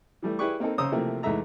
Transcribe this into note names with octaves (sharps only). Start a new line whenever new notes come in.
E3 G3 A3
E4 G4 G#4 B4 D5 C#6
A#3 C4 D#4 A4
C#3 C5 C#5 A#5 D#6 E6
C3 E3 F3 A3 A#3 C4
E2 G#2 G#3 A3 E5 A#5